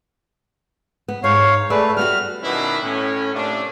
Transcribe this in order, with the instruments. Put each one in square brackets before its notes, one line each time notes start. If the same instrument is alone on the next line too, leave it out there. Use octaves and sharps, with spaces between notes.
[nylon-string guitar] B3
[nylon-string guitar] G#2 [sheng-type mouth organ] C#5 F5
[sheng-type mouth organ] A3 B4 [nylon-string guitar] G#4 D5 E5
[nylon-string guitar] G3 B3 F#4 [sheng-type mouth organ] F6
[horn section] B2 D#3 B3 C#4 D4 E4
A2 C#4
A2 C3 A3 A#3 D4